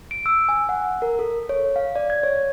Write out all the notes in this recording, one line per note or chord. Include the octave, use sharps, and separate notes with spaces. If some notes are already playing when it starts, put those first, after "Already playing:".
D7
E6
G#5
F#5
A#4
A4
C#5
F5
D5
G#6
C#5